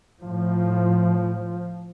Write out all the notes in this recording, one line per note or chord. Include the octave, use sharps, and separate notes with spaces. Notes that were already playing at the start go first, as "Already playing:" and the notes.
A2 F3